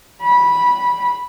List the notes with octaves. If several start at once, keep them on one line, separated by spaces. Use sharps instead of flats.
B5